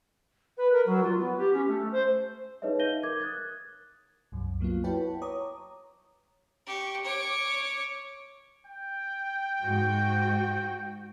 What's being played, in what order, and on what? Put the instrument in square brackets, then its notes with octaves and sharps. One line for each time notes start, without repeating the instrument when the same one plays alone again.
[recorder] B4
A#4
F#3
F4
B3
G4
C#4
A3
C5
[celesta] D#4 G#4 B4 C#5 D#5 E5
D#4 F5 G6 A#6 D#7 G7
A#4 D6 G#6
D#6 F#6 G#6 A6
[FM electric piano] C2 F#2
F#3 A#3 B3 F4
E4 F#4 B4 C#5 G5 A5
C#5 A#5 D6 D#6
[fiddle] G4 C#6
C#5 D6
[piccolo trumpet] G5
[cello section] G#2 F#4